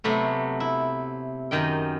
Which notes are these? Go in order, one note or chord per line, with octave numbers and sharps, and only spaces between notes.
C3 F#3 A3 B3
E4
F#2 D#3 D#5 G5